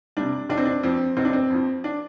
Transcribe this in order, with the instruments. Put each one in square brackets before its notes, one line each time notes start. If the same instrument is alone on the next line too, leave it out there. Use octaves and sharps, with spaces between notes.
[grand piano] C3 G3 D4
F1 D4
C4
D4
F2 F3 C4
F1 C4
D4
C4
F2 F3
D4